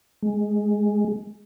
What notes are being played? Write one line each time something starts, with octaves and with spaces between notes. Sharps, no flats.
G#3